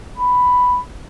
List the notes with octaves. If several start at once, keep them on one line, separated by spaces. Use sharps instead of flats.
B5